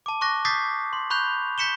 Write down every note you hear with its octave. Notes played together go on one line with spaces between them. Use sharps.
A5 D6
C#6 D6 F#6 A#6
D6 D#6 G6 A6 B6 C7
C6
B5 C#6 F#6 G6 F7
G6 B6 C#7 E7 G7